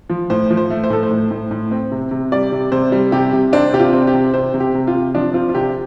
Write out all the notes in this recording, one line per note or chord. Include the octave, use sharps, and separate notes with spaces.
F3
A2 C5
F3
C5
A3
C5
A2 A4
C5
A2
A2
A2
C4
C3
C3
G3 D5
C3
C3 C5
G3
C3 G4
C3
C4 D4
C3 G4
F4
C4
G4
C3
C3 C5
C3
G4
C3
F4
C3
F3 D4
C4 F4
F4
C3 G4